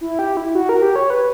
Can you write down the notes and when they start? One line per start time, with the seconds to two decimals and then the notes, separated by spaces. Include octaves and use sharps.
0.01 E4
0.19 G4
0.37 E4
0.55 F#4
0.69 A#4
0.82 G4
0.96 C#5
1.10 B4